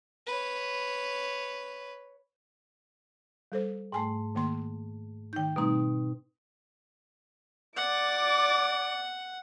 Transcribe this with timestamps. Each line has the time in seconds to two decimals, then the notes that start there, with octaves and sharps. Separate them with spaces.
0.26 B4 C#5
3.52 G3 A4 C5
3.92 G#2 A3 G5 G#5
4.35 D#3 A#3 C6
5.33 D#3 D#4 G5 G6
5.56 B2 G3 A3 C4 D#4 A#5
7.77 D5 F#5 D6